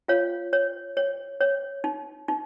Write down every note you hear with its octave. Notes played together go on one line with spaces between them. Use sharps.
F4 C#5 F5
C#5
C#5
C#5
D#4
D#4